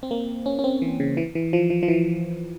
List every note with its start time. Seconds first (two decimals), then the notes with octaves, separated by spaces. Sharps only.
0.03 C4
0.11 A#3
0.46 C#4
0.59 C#4
0.64 C4
0.82 E3
1.00 C#3
1.17 E3
1.35 E3
1.53 F3
1.70 F3
1.83 F3
1.88 E3